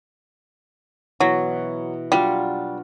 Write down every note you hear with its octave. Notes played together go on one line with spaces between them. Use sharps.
B2 E3 F#3
F#3 G3 D4 F4